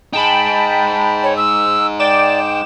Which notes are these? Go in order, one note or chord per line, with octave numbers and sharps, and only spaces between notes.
D#4 G#4 G5 A5 B5
C#5
E6
D5 G5 D6 E7